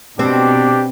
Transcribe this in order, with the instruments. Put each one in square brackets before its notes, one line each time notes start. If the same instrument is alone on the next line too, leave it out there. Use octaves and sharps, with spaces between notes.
[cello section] B2 [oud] C4 [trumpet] D4 [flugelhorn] G4